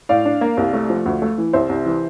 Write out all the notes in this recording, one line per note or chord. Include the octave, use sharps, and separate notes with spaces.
A2 D5 F5
D4
A#3
C2
A3
F3
D2
A3
E3
C2 C5 E5
C2
E3